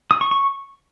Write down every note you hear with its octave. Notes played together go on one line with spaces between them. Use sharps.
D#6
C#6
C#6